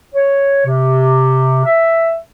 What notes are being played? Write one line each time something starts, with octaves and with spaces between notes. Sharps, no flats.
C#5
C3
E5